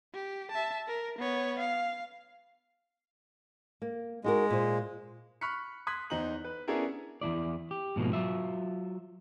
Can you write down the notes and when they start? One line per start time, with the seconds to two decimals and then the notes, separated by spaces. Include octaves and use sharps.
0.14 G4
0.51 E5 A5
0.87 A#4
1.19 B3 C#5
1.59 F5
3.82 A#3
4.24 G#3 D#4 F#4 A#4
4.50 A#2 C5
5.41 B5 C#6 F6 F#6 B6 C#7
5.87 C6 D#6 F#6 G#6 B6
6.10 E2 D#4 C5 A#5 F#7
6.45 B4
6.68 B3 C#4 D4 E4 G#4 A#4
7.21 E2 G2 E4 D5
7.71 G4
7.96 G#2 B2 F3 A#3
8.13 F#3 F4 E5